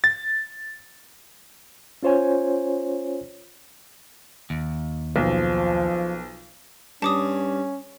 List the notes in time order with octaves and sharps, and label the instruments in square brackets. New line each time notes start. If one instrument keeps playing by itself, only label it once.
[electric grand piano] A6
[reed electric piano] C#4 F4 C5 C#5 G#5
[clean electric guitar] D#2
[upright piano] B1 [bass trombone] F3
[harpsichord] G2 [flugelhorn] C#4 [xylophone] A5 D6 D#6